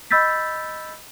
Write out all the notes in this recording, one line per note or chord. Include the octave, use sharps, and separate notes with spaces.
D#5 B5 E6 G6 A6 B6